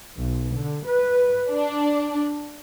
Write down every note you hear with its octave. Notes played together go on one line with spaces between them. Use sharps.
B1
D3
B4
D4